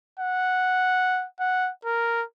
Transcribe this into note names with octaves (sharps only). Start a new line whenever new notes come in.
F#5
F#5
A#4